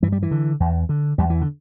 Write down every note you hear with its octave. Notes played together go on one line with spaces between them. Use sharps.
G2 E3
G3
E3
D3
E2
D3
E2 G3
E3
D3